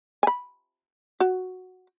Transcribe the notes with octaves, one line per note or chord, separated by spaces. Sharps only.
G#5 B5
F#4